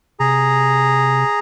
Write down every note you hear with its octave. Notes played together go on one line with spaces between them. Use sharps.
C3 G#4 A#5